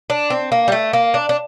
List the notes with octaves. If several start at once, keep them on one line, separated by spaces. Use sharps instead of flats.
D4
C4
A#3
G3
A3
A#3
D4
D4